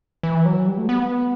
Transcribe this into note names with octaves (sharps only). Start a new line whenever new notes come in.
E3
F#3
G3
A3
B3